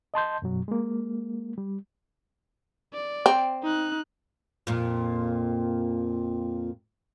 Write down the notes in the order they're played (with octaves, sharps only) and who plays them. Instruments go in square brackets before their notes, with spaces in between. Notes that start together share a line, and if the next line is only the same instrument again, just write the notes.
[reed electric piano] D#5 A5 C6 G6
F#2 B2 F#3
G#3 A#3
G3
[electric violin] D5
[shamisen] C4
[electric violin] D#4 F#6
[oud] F2 A#2